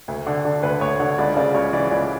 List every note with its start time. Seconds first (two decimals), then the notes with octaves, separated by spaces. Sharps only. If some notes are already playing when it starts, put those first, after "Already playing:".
0.08 D2
0.27 D3
0.45 D3
0.63 D2 B4
0.81 D2 C#5
1.00 D3 F#5
1.18 C#2 D5
1.36 C#3 D5
1.54 C#2 C#5
1.73 E3 D5
1.91 C#2